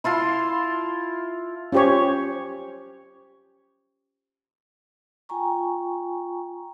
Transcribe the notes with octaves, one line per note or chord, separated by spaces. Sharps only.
E4 F4 A5 C6
C#4 F4 G4 C5 C#5
F4 G5 G#5 A#5 C#6